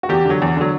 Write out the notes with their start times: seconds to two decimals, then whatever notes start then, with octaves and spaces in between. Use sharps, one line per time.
0.03 F#4
0.09 E2 G4
0.25 D3 F#3
0.42 E2
0.57 D3 F#3